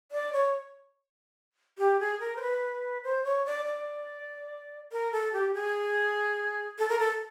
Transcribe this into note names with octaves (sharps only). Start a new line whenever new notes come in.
D5
C#5
G4
G#4
A#4
C5
B4
C5
C#5
D5
D5
A#4
A4
G4
G#4
A4
A#4
A4